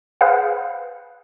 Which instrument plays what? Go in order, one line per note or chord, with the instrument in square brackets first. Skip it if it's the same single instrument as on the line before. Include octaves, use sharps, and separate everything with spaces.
[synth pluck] G#4 B4 C5 F5 F#5